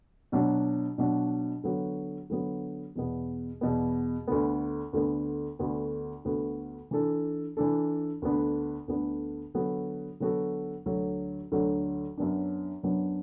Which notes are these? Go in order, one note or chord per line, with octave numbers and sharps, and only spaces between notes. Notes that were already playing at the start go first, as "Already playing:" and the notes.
B2 F#3 D4 F#4
B2 F#3 D4 F#4
D3 F#3 B3 F#4
D3 F#3 B3 F#4
E2 B2 B3
E2 B2 B3
D2 D3 B3
D2 D3 B3
D2 D3 B3 F#4
D2 D3 B3 F#4
E3 D4 A4
E3 D4 A4
D2 D3 B3 D4
D2 D3 B3 D4
D3 F#3 B3 F#4 A4
D3 F#3 B3 F#4 A4
D2 D3 F#3
D2 D3 F#3
F#2 F#3 B3 D4
F#2 F#3 B3 D4